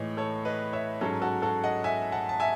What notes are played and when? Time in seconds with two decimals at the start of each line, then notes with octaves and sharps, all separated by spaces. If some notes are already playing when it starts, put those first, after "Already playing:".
Already playing: A2 E3 G#3 D#4 C#5
0.17 A4 C#5
0.45 B4 D#5
0.73 C#5 E5
1.01 G#2 F#3 C#4 A4 C#5
1.22 F#4 A4
1.42 F#4 A4
1.64 D#5 F#5
1.84 E5 G#5
2.12 F#5 A5
2.29 A5
2.40 E5 G#5